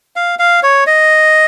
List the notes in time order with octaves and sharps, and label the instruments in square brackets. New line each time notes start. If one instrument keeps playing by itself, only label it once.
[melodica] F5
F5
C#5
D#5